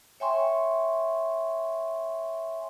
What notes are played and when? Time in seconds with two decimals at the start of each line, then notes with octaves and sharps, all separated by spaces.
0.20 C#5 E5 G5 G#5 C6 C#6